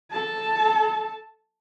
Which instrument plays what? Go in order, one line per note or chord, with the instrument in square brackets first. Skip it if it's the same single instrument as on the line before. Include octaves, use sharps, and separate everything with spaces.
[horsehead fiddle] A4 A5